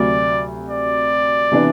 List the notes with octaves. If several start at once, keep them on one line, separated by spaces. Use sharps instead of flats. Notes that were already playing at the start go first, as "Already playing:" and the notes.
Already playing: D2 C3 F#3 D5
D5
C3 E3 B3 D4